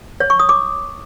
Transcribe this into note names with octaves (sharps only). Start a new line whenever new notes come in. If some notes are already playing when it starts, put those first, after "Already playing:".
C#5
C#6
D#6
D6